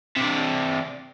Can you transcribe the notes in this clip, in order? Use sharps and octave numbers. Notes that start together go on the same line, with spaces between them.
C3 D4